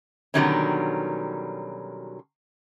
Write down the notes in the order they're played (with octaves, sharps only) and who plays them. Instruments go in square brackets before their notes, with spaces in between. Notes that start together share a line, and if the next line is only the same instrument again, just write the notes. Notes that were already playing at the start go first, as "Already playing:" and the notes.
[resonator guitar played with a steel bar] B2 D3 D#3 F#3 G3 C#4